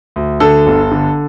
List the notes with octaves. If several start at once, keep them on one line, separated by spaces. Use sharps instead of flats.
D2
D3 A4
G1
D3